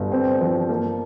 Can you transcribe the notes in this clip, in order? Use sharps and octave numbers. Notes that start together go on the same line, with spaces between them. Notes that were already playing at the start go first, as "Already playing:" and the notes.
Already playing: G1
C4
F3
A#3